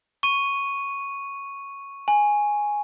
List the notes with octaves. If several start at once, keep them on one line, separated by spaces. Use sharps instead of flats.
C#6 D#7
G#5